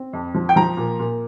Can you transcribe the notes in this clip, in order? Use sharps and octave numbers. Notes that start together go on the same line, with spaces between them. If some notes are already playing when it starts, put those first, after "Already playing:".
Already playing: C4
F2
F3
G5
F3 A#5
A#2
A#2